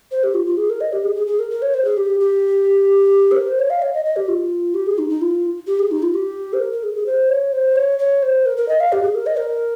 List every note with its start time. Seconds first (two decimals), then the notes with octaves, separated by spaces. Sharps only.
0.11 C5
0.24 G4
0.34 F4
0.46 F4
0.57 G#4
0.70 A#4
0.81 D#5
0.93 G4
1.05 G#4
1.16 G#4
1.27 G#4
1.39 A#4
1.50 A#4
1.62 C#5
1.74 C5
1.85 G#4
1.97 G4
2.20 G4
3.32 C5
3.36 A#4
3.48 C5
3.59 C#5
3.70 F5
3.82 C#5
3.94 D#5
4.05 D#5
4.16 G4
4.28 F4
4.74 G4
4.86 G#4
4.98 D#4
5.10 D#4
5.21 F4
5.67 G4
5.79 G#4
5.91 D#4
6.02 F4
6.14 G4
6.53 C5
6.60 A#4
6.72 A#4
6.83 G#4
6.95 G#4
7.06 C5
7.29 C#5
7.52 C5
7.76 C#5
7.99 C#5
8.22 C5
8.46 A#4
8.57 A#4
8.69 D#5
8.80 F5
8.92 G4
9.03 G#4
9.15 A#4
9.26 D#5
9.38 A#4